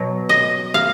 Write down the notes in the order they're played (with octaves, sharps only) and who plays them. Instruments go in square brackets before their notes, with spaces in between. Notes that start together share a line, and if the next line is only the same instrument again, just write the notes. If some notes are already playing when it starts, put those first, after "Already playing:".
Already playing: [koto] B2 F#3
D#5
F5